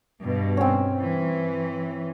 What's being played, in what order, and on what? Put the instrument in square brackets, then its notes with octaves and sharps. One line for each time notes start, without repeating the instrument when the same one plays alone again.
[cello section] G2 B2
[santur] C4 C#4
[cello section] E3